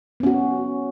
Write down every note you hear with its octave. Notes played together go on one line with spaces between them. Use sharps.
B3 C#4 F#4